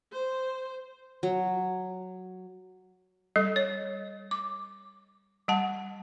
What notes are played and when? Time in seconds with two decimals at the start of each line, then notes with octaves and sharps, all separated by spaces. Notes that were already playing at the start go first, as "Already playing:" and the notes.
0.12 C5
1.23 F#3
3.36 G3 A4 D#5
3.56 C#5
4.31 D6
5.48 G3 F#5 A5